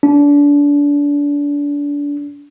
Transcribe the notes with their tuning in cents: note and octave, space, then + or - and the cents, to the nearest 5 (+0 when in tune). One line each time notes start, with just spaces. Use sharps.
D4 -30